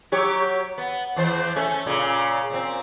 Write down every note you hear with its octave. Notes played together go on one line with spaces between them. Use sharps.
F#3 G4 C#5
B3
E2 E3 C5
A3 C#4
A#2 C#3
A#2 C4